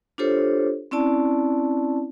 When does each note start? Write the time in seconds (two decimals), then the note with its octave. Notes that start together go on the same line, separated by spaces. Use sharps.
0.18 D4 F4 G4 A4 C5 C#5
0.91 C4 C#4 E4 D5 A5